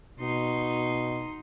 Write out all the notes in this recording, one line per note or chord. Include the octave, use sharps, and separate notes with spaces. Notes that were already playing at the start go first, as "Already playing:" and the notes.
B2 D#4 C6